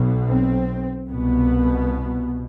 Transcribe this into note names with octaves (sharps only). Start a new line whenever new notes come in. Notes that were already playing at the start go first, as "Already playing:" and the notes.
Already playing: B1 B2
C4
C2 B2 B3